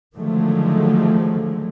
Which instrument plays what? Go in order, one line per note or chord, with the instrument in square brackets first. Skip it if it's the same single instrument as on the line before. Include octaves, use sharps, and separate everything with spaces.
[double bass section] D3 D#3 F3 F#3 G#3 A3